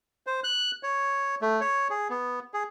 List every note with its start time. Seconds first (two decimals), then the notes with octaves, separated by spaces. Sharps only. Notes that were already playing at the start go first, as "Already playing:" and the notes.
0.27 C5
0.44 F#6
0.83 C#5
1.42 A3
1.61 C#5
1.90 G#4
2.10 B3
2.54 G#4